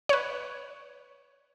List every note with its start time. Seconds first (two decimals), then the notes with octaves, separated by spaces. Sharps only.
0.09 B4 C#5